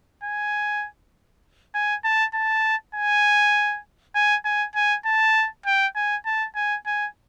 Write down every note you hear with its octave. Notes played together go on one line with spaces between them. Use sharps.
G#5
G#5
A5
A5
G#5
G#5
G#5
G#5
A5
G5
G#5
A5
G#5
G#5